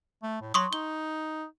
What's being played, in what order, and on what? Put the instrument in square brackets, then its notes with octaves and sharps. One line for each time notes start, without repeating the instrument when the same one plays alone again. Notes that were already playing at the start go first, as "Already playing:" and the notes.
[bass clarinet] A3
A2
[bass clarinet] F#3 [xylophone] C6 C#6 D#6
[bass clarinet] D#4 [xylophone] G7